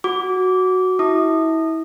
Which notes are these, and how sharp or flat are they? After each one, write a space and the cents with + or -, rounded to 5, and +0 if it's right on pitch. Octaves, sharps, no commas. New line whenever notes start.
F#4 +0 D6 -20
E4 -30 D#6 -25